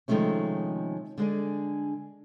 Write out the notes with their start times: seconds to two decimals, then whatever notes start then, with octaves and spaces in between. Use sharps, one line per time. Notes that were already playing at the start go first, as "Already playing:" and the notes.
0.08 C3 D#3 F3 G#3 A3 C#4
1.18 D3 G#3 G#4 D5